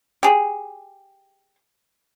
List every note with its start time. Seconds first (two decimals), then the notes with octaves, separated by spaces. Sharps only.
0.23 G4 G#4